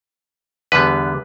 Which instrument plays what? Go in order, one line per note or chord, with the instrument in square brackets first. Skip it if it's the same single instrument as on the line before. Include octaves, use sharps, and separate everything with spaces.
[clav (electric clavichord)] E2 D3 G3 B3 B4